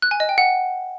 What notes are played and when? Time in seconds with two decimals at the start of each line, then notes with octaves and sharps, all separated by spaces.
0.02 F#6
0.11 G#5
0.20 D#5
0.29 G5
0.38 F#5